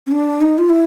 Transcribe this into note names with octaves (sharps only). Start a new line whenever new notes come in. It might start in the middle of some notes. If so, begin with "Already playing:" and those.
C#4
D4
D#4
F4
E4